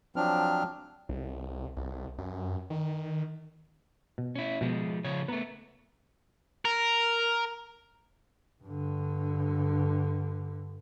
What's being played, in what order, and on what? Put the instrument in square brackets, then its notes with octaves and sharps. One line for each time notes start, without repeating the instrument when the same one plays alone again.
[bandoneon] F3 F#3 C4 D4 F6
[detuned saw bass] C2
C2
F#2
D#3
[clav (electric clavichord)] B2
[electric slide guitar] C#4 E4
[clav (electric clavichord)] B2 [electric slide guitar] F3 G#3
[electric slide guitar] C#3 F3 C#5
[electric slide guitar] A3 B3 [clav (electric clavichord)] B4 A#5
[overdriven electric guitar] A#4
[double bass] G2 D3